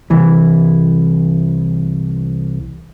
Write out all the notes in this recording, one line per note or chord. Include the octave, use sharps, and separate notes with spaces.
C2 E3